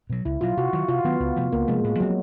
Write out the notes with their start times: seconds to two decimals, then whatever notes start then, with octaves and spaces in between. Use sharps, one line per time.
0.10 B2 F#3
0.25 C#2 E4
0.41 B2 F#3 F4
0.57 C3 F#4
0.73 D#3 F#3
0.88 C3 F4
1.04 D#3 F#3 B3
1.20 C#2
1.36 C3 F3 A3
1.52 C#2 A#3
1.68 C3 F3 G#3 A3
1.84 A2
2.00 F3 F#3 G#3 C4